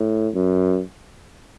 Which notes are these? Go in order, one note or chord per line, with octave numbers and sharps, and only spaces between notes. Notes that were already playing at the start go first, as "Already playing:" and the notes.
Already playing: A2
F#2